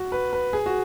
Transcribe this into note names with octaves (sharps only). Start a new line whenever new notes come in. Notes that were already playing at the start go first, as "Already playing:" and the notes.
Already playing: F#4
B4
B4
G#4
F#4